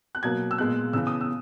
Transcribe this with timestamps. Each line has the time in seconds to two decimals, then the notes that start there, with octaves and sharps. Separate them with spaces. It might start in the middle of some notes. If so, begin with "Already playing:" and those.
0.15 F#6
0.23 B2 F#3 A#3 G#6
0.51 E6
0.58 A#2 G#3 B3 F#6
0.93 C#3 E3 B3 E6
1.07 D#6
1.21 E6